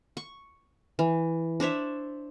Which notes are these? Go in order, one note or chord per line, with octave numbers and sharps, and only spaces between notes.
C#6
E3
D4 C5 C#5 E5